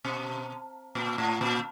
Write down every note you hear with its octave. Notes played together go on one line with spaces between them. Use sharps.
B2
A#2
A2
A#2